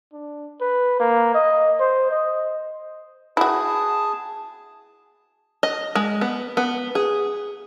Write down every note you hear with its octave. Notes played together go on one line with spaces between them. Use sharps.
D4
B4
A#3
D#5
C5
D#5
E4 F#4 G#4 A5
D#5
G#3
B3
B3
G#4